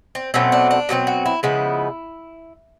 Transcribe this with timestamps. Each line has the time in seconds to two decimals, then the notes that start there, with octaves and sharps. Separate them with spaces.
0.15 C4
0.34 B2 F#3 A3 C4 C#4
0.52 D4
0.71 D4
0.89 B2 F#3 A3 C4
1.07 F#4
1.26 E4
1.43 C#3 F3 G#3 B3 E4